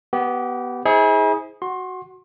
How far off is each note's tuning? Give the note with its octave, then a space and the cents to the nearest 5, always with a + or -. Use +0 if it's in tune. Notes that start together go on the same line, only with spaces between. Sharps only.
B3 +0 G4 -25
E4 -45 G#4 +0 C5 +0
F#4 +0 C6 +25